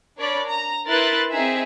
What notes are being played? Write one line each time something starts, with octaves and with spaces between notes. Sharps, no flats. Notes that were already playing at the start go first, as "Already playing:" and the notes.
D4 A#4 C#5 D5 B5
A#5
E4 A#4 B4 C6 F#6 A6
C4 D#4 G#4 E5